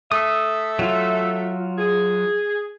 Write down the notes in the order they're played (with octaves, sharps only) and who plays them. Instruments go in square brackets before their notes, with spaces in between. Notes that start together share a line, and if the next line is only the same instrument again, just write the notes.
[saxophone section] A3 A4 E5 [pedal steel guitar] D#6
[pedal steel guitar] F#3 F4
[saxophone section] G#4